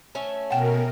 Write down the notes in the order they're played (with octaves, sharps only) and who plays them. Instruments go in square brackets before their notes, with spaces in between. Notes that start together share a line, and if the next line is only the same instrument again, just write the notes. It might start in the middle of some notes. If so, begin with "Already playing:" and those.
[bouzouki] A3 C#4 E5
[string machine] B2 A#4 [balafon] F#5 G5